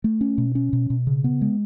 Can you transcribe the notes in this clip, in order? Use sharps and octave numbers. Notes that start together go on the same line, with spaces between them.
A3
C#4
B2
C#4
B2
B2
C#3
B3
G#3